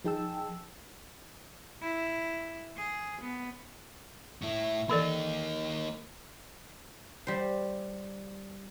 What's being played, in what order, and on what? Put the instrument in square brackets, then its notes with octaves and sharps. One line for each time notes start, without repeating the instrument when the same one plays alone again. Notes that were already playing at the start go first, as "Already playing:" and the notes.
[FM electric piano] F3 D#4 G#4 G5 A5 E6
[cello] E4
G#4
B3
[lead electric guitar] A2 E4
[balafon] E3 A4 D5 [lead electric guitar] A#3 D#4
[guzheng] G3 C5